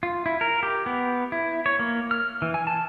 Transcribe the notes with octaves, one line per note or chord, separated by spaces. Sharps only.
F4
E4
A#4
G4
B3
E4
C#5
A#3
F6
E3
G#5
A5